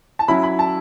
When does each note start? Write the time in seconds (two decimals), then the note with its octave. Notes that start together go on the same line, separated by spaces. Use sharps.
0.19 A5
0.28 F#3 C#4 E4 B5
0.43 B5
0.59 A5